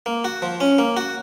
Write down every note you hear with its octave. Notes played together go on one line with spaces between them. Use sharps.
A#3
F#4
F3
C#4
A#3
F#4